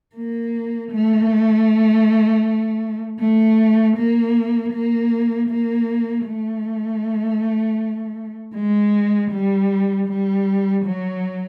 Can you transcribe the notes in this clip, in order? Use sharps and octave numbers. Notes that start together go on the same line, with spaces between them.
A#3
A3
A3
A#3
A#3
A#3
A3
G#3
G3
G3
F#3